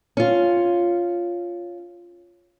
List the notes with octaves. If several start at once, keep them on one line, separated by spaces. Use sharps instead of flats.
C#4 F4